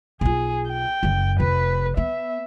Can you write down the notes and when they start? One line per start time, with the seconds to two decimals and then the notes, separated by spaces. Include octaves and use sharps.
0.21 B1 F4 G#4
0.68 G5
1.03 F#1 F#2
1.40 F1 B4
1.97 B3 E5